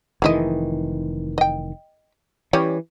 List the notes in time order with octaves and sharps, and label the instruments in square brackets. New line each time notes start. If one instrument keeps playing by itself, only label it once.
[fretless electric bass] F1 D#3 E3 [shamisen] G#3 E4 D#5
[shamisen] D#5 G5
[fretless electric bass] E3 [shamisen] G3 C#4 C#5